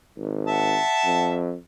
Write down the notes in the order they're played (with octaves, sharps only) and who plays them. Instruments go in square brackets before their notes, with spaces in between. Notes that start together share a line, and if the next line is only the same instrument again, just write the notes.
[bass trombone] G#1
[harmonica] E5 F#5 A5
[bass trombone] F2